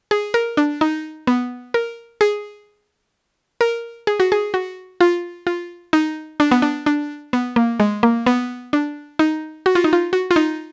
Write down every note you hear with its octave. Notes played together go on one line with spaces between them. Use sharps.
G#4
A#4
D4
D#4
B3
A#4
G#4
A#4
G#4
F#4
G#4
F#4
F4
F4
D#4
D4
B3
D4
D4
B3
A#3
G#3
A#3
B3
D4
D#4
F#4
F4
D#4
F4
F#4
F4
D#4